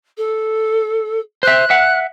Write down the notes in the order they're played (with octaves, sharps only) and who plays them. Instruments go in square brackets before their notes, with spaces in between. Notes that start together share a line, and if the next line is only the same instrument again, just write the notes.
[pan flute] A4
[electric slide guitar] C5 E5 [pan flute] F#6
[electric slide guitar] E5 F#5